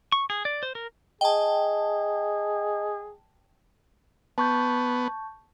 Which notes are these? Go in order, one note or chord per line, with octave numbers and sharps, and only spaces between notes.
C#6
G#4
D5
C5
A#4
G#4 D#5 G5 A5
B3 A5 C#6 G6